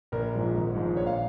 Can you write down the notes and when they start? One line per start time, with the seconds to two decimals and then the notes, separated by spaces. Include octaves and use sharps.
0.12 A#1 A#4
0.34 G#2 F3 G#3
0.55 G#1
0.75 G#2 F3 G#3
0.96 A#1 C#5
1.06 F5